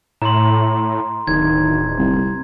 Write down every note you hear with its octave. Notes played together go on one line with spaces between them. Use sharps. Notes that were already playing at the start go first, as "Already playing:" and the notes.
A2 A#5 C6
D1 D#3 G#6
C2